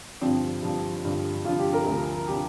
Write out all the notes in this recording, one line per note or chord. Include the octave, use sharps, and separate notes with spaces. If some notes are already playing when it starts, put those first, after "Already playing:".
G2 D3 F3 C4
G2 D3 F3
G2 D3 F3
G2 D3 F3 F4
G4
A#4
D2 D3 F3
D3 F3 G4